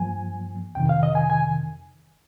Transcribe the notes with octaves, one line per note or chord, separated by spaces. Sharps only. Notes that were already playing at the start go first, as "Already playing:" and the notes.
Already playing: G2 F3 A#3 G#5
F2 C3 D#3 G5
F5
D#5
G#5
G#5